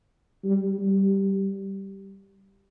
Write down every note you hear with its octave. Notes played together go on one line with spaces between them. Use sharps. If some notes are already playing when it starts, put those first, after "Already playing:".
G3
G3